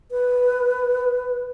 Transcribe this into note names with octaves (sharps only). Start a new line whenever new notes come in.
B4